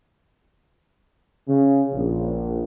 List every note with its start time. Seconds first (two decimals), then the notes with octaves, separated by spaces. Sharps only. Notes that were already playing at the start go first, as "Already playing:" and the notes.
1.48 C#3
1.92 A#1